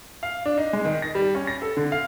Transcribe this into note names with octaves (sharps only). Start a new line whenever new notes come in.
F5
D4
D#4
G#3
D#3
A#6
G3
C#4
A#6
A4
D3
F5